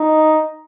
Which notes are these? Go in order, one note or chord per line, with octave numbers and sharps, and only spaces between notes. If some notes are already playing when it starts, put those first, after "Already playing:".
Already playing: D#4